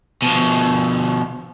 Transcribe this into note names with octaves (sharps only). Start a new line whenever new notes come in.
B2 F3